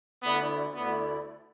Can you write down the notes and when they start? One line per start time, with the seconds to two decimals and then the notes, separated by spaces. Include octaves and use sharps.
0.23 D2 D3 A3 B3 E4 D5
0.75 D2 D3 A3 B3 E4 D5